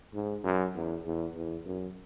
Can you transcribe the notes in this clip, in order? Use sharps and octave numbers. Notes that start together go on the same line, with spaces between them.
G#2
F#2
E2
E2
E2
F#2